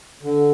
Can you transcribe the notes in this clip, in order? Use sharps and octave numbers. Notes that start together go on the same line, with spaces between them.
D3